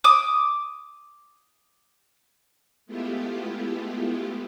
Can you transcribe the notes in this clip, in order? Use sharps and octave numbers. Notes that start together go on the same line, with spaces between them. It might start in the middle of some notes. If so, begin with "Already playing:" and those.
D6 D#6
G#3 A3 B3 E4 F4 G4